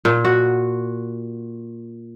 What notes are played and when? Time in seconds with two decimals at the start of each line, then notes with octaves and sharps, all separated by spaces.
0.05 A#2
0.25 F#4